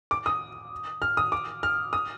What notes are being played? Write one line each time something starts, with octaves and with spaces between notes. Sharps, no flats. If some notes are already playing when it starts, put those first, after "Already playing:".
D6
D#6
F6
D#6
D6
F6
D#6